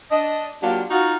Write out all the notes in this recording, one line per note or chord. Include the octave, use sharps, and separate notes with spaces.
D4 D#5
F#3 A#3 D4 F4 G4
D#4 F4 F#4